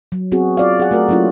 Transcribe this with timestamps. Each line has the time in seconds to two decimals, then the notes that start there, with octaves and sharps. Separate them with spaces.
0.12 F#3
0.32 B3 C4 F#4 G#4
0.57 F4 D5 F5
0.80 G#4 F#5
0.91 A3 F#4 A#4 D5
1.09 F#3 A#3 C#4 E4 F4